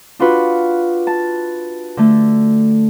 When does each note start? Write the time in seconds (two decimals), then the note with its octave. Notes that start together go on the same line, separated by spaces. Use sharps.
0.19 D4 F4 F#4 B4
1.07 A5
1.97 D3 A3